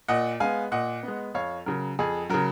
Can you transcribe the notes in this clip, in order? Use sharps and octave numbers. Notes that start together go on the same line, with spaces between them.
A#2 D#5 F#5
G#3 B3 F5 G#5
A#2 D#5 F#5
B3
G#3
F2 C#5 F5
C#3 F#3 A#4
F2 G#4
C#3 F#3 A#4